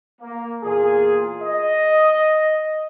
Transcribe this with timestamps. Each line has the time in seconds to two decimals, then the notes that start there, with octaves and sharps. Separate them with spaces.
0.22 A#3
0.63 E2 A#2 F4 G#4
1.43 D#5